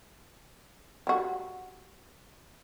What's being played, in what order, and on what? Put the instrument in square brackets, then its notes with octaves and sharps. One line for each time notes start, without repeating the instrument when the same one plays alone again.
[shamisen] G3 F#4